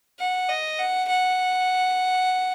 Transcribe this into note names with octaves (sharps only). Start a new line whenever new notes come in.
F#5
D#5
F#5
F#5